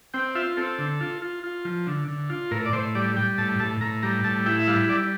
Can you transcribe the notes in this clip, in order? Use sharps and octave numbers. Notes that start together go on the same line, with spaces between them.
C4 G5
F4 E5
C4 A4
D3
F4
F4
F4
F3
D3
D3
F4
A2 A#4
D5
A2 C5
G3 D5
G3 G5
A2 A5
A2 A5
A2 A#5
G3 A#5
A2 A5
E4 G5
E5
G3 F5
G3 D5